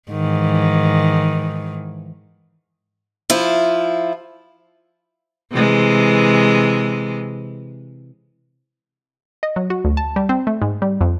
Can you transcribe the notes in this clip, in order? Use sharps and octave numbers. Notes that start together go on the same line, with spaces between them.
G#2 D#3 E3
F3 E4 F4
C3 E3 G#3
D#5
F#3
F#4
D2
A5
G3
C4
A3
G#2
G3
F2